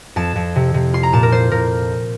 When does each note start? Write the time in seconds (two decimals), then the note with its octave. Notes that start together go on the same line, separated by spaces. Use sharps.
0.16 F2 A5
0.36 F2
0.56 C3
0.74 C3
0.93 F4 C6
1.03 A#5
1.13 A#2 A5
1.23 A#4
1.32 F4 C5
1.51 A#2 A#4